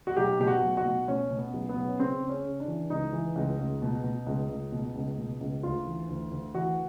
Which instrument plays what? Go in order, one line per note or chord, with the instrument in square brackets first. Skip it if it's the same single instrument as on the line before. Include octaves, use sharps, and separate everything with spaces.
[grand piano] F#4
B1 G4
B2 G4
F#4
B1
F#4
B2
B2 C#4
B2
B3
B1
B3
B1
C#4
C#3 C4
C#3
C#4
C#3
D4
E3
C#2 D#4
E3
C#2
C#2
B2
B2
C#2
C#2
B2
C#2
B2
C#2
D2 F4
E3
D2
D2
E3 F#4